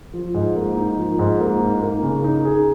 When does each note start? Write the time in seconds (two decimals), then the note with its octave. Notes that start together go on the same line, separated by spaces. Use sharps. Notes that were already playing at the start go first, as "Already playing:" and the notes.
0.14 F3
0.34 G#2
0.56 A#3
0.77 D#4
0.98 F3
1.19 G#2
1.40 A#3
1.61 D#4
1.82 A#3
2.03 C#3
2.24 D#4
2.45 G#4